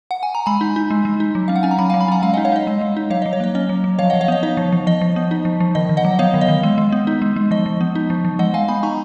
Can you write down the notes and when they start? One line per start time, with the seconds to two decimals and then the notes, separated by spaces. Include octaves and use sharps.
0.11 F#5
0.23 G#5
0.35 A#5
0.46 G#3 G#5 B5
0.61 D#4
0.76 D#4
0.90 G#3
1.05 G#3
1.20 D#4
1.35 F#3
1.48 C#4 F5
1.56 F#5
1.63 C#4 G#5
1.71 A#5
1.78 F#3 G#5 B5
1.90 F#3 F5 G#5
2.01 G#5 B5
2.08 C#4 F#5 A#5
2.22 G#3 F5 G#5
2.33 D#4 D#5 F#5
2.45 C#5 F5
2.52 D#4 D#5
2.67 G#3
2.81 G#3
2.97 D#4
3.10 F#3 C#5 F5
3.22 F#3 D#5
3.33 C#5
3.40 A#3 D#5
3.55 C#4 D#5
3.69 F#3
3.84 F#3
3.99 F3 C#5 F5
4.10 F3 D#5 F#5
4.21 C#5 F5
4.28 B3 D#5
4.43 D#4 C#5
4.57 F3
4.72 F3
4.87 F3 D#5
5.01 F3
5.16 B3
5.31 D#4
5.45 F3
5.60 F3
5.75 D#3 D#5
5.89 D#3
5.97 D#5 F#5
6.05 F#3
6.19 B3 C#5 F5
6.34 D#3
6.41 D#5
6.49 D#3
6.63 G#3
6.78 G#3
6.92 B3
7.07 D#4
7.22 G#3
7.36 G#3
7.51 F3 D#5
7.66 F3
7.81 B3
7.95 D#4
8.10 F3
8.25 F3
8.39 G#3 D#5 F#5
8.54 G#3 F5 G#5
8.68 B3 G#5 B5
8.83 D#4 A#5 C#6